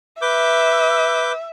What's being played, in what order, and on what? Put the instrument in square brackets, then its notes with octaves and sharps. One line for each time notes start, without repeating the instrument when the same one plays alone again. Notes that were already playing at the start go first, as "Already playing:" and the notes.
[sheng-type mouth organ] B4 D6 G6 [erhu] E5